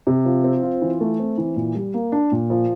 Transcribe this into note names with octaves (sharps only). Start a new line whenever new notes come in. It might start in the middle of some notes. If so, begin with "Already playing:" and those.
C3
F3
C4
F4
E3
A3
C4
E3
A#2
G3
A#3
D4
A#2
F3